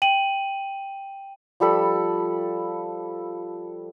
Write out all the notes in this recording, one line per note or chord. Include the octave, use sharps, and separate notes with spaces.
G5 D#7 F#7
F3 G3 A4 B5